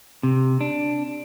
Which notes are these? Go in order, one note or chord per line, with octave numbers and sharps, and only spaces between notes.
C3
D4